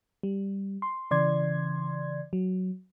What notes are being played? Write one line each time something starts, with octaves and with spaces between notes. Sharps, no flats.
G3
C6
C#3 E3 D5 C6 G#6
F#3